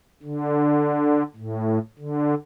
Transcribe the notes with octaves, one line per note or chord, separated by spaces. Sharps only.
D3
A2
D3